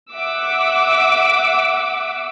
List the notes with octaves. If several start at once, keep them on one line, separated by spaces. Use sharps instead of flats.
E5 F#5 D6 E6